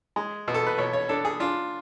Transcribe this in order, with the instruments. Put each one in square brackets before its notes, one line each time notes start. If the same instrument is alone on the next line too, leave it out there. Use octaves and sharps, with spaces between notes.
[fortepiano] G#3
B2
A4
B4
B2 C#5
C#5
D4 A4
G#4
D4 F4